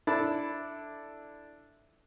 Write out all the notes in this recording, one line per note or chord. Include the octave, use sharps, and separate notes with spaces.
D4 E4 A4 A5 B5 D6